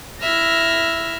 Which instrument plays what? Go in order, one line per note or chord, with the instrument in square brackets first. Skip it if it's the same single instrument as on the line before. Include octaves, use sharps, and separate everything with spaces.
[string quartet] E4 F6 A#6 [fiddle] E5